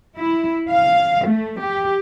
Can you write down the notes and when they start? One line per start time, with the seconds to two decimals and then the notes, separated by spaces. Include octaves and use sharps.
0.17 E4
0.69 F5
1.27 A3
1.60 G4